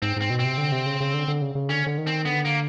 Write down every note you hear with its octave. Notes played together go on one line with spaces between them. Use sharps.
G#2 C4
G#2 C4
B2
C4
C3
D3
C3
C#3
C#3
D3
D3
C#3
C#3
D3 C#4
D3
D#3
C4
D3 B3
A#3